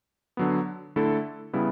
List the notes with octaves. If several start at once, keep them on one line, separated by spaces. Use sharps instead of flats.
D3 F#3 B3
D3 A3 E4 A4
C#3 G3 B3 E4